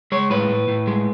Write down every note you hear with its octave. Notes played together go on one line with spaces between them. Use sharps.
G#3 C#5
A2 B4
A2
A2
G#3